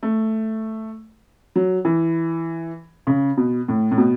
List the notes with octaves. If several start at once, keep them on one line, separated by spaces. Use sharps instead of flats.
A3
F#3
E3
C#3
B2
A2
A2
B2